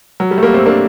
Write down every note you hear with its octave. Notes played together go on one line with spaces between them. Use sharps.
F#3
G3
A3
G3 A#3
A3 C4
A#3 D4